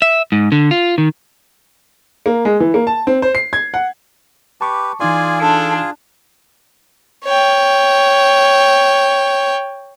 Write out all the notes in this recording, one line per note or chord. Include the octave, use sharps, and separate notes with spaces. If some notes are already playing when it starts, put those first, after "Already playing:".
E5
G#2
D3
F4
D#3
A#3
G#3
E3
A#3
A5
C4
C5
C7
G#6
F#5
G4 B4 A5 C#6 D6
E3 D#4 F4 G#4 D5 G#5 C6
D4 A4
C#5 G5